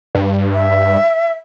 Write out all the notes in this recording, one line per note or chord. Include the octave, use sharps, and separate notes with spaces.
G2
E5